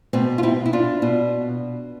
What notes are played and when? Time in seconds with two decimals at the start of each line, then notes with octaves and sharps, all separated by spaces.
0.13 B2 A3 C4
0.38 F4
0.43 C4 E4
0.66 E4
0.73 D4 F4
1.02 B2